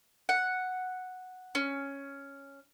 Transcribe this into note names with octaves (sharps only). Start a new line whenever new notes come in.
F#5
C#4